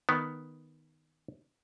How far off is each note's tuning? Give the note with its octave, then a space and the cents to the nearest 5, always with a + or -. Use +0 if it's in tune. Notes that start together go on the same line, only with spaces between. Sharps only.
D#3 +0 B3 +0